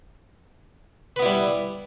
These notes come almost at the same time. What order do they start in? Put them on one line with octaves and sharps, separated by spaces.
B4 B3 E4 G3